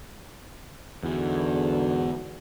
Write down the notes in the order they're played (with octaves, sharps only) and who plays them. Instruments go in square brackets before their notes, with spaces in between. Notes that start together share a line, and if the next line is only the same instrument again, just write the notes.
[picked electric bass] E2 [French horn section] G#2 D3 F#4